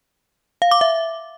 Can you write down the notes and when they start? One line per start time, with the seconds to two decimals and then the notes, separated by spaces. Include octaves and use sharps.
0.62 F5
0.71 D6
0.81 E5